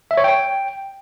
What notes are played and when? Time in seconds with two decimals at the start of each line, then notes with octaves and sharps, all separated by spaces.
0.11 E5
0.17 C#5
0.24 G5